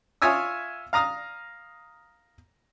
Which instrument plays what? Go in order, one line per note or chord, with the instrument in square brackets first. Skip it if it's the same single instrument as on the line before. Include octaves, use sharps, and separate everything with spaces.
[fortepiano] F4 C#5 E5 G#5 D#6 E6
F5 A#5 D#6 F6